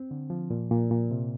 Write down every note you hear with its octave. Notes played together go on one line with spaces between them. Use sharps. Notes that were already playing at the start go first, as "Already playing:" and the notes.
Already playing: C4
D3
F3
A#2
A#2
A#2
C3